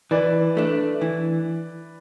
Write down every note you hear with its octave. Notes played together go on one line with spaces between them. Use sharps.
E3 B4 D5
A3 D4
E3